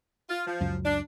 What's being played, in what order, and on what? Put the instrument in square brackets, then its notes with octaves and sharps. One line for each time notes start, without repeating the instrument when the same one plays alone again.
[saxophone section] F4
F3
[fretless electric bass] C#2 F#2
[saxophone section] D4